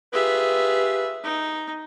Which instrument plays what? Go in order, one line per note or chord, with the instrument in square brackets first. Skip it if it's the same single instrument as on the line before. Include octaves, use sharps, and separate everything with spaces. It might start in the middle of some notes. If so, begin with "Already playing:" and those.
[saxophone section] F4 G4 B4 [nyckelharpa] G#4 E5
[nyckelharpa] D#4